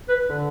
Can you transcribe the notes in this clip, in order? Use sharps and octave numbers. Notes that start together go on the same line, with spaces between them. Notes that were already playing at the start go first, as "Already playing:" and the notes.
B4
D3